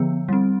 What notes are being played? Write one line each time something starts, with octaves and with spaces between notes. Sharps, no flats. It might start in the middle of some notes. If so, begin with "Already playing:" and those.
Already playing: D3 F3 B3
G3 C4